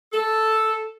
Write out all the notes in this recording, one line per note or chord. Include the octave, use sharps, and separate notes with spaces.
A4